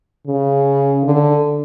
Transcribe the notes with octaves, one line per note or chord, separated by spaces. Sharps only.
C#3
D3